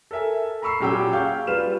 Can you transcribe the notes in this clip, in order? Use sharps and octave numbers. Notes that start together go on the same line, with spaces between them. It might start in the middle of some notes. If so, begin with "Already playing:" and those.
A4 A#4 E5 G#5
A#5 B5 C#6 E6 C7
A#2 F#3 C#4 G4 G5 E6
G#4 F5 C#6 G6
G3 F4 B4 F6 E7